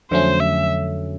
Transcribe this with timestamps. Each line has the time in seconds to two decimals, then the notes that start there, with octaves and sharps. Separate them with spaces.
0.11 F2 D3 F#3 A3 C#4 C5
0.40 E5